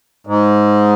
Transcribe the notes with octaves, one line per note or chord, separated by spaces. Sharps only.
G#2